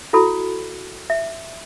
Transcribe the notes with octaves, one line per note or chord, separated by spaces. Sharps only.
E4 F#4 A4 B5
E5